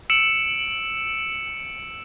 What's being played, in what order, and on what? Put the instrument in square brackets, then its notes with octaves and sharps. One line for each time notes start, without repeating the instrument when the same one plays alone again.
[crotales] E6 C#7 D7 E7 F#7